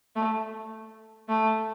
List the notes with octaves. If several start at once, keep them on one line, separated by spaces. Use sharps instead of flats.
A3
A3